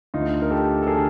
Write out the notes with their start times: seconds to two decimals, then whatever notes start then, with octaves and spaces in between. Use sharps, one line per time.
0.14 D2 D3 D#4 F4
0.42 A#4
0.50 G4 A4
0.83 A4
0.87 D3 G#4 A#4